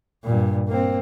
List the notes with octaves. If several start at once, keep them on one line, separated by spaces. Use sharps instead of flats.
G2 A#2
A#3 C4